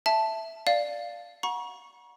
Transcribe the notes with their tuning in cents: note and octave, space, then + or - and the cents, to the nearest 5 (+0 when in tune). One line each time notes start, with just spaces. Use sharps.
E5 +0 A5 +0
D5 +0 F5 +0
F#5 -20 A#5 +40 C#6 +0